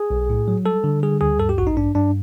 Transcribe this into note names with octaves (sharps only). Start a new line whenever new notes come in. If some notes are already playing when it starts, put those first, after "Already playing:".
Already playing: G#4
B1
A2
F#3
G3 A4
D3
G3 G#4
D2 G#4
G2 A4
G4
A1 F#4
D#4
G2 D4
G2 D4